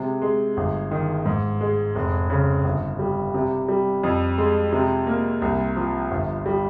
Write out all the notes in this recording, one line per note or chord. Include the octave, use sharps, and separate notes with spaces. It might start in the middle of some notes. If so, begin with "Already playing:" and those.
Already playing: C3 G#3
G#3
G1
D#3
G#2
G#3
F1
C#3
G1
G3
C3
G3
F2
G#3
C3
A#3
C2
F3
G1
G3